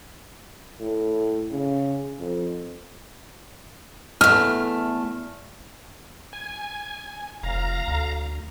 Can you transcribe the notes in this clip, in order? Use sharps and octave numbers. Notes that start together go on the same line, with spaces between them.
A2
C#3
F2
E2 A3 F6
G#5
F1 F5 A#5
D2